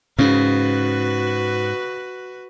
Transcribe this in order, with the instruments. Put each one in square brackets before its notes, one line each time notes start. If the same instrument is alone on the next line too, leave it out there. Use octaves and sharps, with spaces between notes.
[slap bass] G#2 [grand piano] C#3 [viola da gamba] F#4 B4